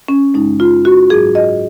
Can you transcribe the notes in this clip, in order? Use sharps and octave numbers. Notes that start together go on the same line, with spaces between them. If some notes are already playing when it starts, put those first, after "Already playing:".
C#4
F#2 C#3 G#3 D#4
F4
F#4
G#2 F#3 G#4
D#5